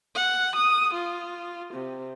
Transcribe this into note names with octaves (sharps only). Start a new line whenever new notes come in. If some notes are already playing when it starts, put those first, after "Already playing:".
F#5
D#6
F4
C3